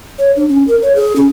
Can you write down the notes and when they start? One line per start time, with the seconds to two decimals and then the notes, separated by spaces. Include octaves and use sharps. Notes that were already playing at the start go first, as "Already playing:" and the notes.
0.19 C#5
0.36 D4
0.49 C#4
0.67 A#4
0.82 C#5
0.95 G#4
1.16 C#4